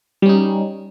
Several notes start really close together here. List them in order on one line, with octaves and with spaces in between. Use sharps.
G3 C#4 D#4